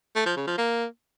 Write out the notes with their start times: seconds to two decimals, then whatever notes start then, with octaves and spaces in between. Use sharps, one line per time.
0.15 A3
0.26 F3
0.37 C#3
0.47 F3
0.58 A#3